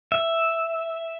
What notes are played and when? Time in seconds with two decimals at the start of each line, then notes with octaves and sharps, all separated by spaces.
0.12 E5